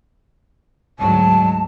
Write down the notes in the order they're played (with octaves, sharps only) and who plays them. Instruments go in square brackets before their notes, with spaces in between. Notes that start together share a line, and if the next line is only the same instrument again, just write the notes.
[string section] D2 G#2 F#3 [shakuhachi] A5